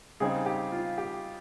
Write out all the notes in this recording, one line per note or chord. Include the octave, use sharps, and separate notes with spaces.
C#3 G3 C4 D#4 G#4
G4
F4
G4